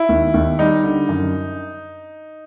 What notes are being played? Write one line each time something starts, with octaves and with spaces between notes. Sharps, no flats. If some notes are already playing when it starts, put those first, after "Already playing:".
Already playing: E4
D#2
D#2
G3 D#4
D3
F#2